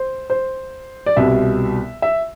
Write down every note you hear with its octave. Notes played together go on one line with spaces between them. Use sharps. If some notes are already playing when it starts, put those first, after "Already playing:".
Already playing: C5
C5
D5
C2 B2 G3 E5
E5